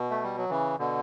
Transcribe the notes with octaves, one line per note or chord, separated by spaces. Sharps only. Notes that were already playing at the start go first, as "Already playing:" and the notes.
Already playing: B2
A3
G3
F#3
C#3 E3
B2 D3